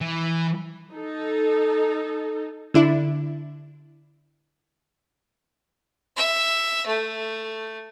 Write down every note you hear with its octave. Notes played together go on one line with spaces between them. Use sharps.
E3
D#4 A4
D3 D4 E4
E5
A3